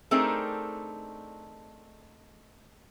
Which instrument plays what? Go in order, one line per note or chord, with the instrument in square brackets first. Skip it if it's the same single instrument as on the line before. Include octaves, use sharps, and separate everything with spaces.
[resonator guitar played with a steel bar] A3 C4 D4 D#4 G#4 A#4